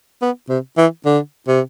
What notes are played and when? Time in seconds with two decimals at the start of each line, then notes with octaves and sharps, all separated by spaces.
0.22 B3
0.49 C3
0.78 E3
1.05 D3
1.48 C3